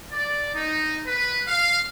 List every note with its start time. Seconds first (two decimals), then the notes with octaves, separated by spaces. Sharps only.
0.12 D5
0.54 D#4
1.06 B4
1.46 F5